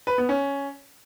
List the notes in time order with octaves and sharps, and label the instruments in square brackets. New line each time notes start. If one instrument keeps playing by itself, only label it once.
[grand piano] B4
B3
C#4